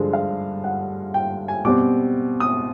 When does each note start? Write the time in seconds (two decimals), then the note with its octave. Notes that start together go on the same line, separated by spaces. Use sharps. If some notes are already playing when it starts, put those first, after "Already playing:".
Already playing: G2 D3 F3 G#3
0.13 F5
0.64 F#5
1.14 G5
1.48 G#5
1.65 B2 G3 C4 D6
2.40 D#6